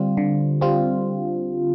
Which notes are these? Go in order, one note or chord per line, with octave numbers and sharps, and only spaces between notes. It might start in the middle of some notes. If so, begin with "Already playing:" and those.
Already playing: D3 G3 C4 F4
D3
G3 C4 F4